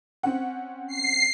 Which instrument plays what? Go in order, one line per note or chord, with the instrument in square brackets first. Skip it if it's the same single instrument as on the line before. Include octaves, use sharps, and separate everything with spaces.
[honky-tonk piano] C4 C#4 F#5
[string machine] C7